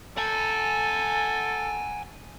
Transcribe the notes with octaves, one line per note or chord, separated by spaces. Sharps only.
A4 F#5 G#5